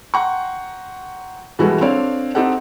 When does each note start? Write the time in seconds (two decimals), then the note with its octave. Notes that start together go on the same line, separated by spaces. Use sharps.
0.14 F#5 G5 A#5 C6 C#6
1.59 B2 E3 G3 G#3 F#4 A4
1.81 C4 D4 A4 C#5 D5 F5
2.35 C4 D#4 G4 A4 F#5